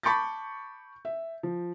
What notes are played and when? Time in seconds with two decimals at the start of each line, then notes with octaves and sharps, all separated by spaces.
0.03 A5 B5 C#6 D6 G6 A6
1.05 E5
1.43 F3